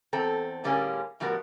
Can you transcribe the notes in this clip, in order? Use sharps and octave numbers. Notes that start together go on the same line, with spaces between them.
E2 C4 A4 A#5
A2 D3 G3 A#3 C#4 G#4
A2 F3 G3 B3 F#4 A#4